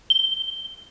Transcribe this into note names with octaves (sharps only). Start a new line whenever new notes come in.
G7